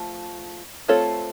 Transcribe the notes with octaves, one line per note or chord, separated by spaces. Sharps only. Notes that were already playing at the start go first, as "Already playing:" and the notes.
Already playing: F3 A3
A3 C4 F4 A4 C#5